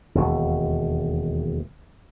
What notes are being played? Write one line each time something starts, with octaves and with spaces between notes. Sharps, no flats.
E1 D#2